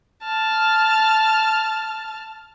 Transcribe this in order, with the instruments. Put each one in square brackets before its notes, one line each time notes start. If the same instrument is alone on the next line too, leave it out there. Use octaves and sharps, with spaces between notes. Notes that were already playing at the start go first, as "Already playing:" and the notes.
[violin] A5 F6